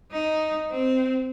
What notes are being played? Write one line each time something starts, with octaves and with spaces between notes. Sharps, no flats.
D#4
C4